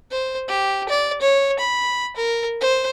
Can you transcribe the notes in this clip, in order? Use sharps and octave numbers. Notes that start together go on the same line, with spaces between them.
C5
G4
D5
C#5
B5
A#4
C5